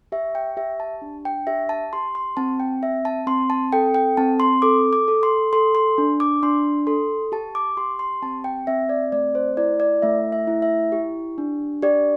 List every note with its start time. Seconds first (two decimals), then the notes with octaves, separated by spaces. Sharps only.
0.12 G4 E5
0.35 G5
0.57 G4 E5
0.80 A5
1.02 D4
1.25 G5
1.47 G4 E5
1.69 A5
1.93 G4 C6
2.15 C6
2.37 C4 A5
2.60 G5
2.82 C4 E5
3.05 A5
3.27 C4 C6
3.50 A5
3.72 A4 G5
3.94 G5
4.17 C4 A5
4.40 C6
4.62 A4 D6
4.93 D6
5.08 A4
5.23 C6
5.53 A4 C6
5.75 C6
5.98 D4
6.20 D6
6.43 D4 C6
6.87 A4 C6
7.32 G4 A5
7.55 D6
7.77 G4 C6
7.99 C6
8.22 C4 A5
8.44 G5
8.67 C4 E5
8.89 D5
9.12 A3 D5
9.35 C5
9.57 E4 D5
9.80 D5
10.02 A3 E5
10.32 E5
10.47 E4
10.62 E5
10.92 G4
11.38 D4
11.82 G4 D5